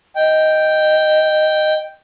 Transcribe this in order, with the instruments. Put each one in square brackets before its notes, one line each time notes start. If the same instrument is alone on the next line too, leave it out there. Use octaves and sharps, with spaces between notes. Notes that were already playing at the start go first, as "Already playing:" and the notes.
[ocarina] D#5 [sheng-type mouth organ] G5